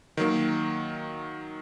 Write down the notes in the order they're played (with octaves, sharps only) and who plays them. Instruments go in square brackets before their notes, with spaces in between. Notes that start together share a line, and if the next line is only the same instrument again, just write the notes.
[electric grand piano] D#3 F#3 A#3